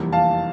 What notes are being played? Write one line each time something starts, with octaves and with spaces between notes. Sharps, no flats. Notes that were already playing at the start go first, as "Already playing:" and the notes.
Already playing: F1 E2 E3 G3 A#3
F5 A5